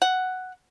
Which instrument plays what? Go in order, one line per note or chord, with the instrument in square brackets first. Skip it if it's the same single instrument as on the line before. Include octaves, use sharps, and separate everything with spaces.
[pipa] F#5